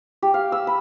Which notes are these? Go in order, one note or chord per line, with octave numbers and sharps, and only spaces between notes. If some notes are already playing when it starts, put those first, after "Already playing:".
G4
F5
E6
B5